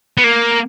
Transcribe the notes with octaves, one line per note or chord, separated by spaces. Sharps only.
B3
A#3